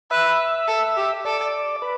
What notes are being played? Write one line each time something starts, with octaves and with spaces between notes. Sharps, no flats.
B4 E5
A4
G4
A4 D5
B4